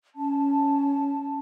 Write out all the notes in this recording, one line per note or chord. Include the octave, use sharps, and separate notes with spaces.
C#4 A5